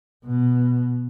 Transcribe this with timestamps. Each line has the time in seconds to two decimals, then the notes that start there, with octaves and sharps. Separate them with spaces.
0.25 B2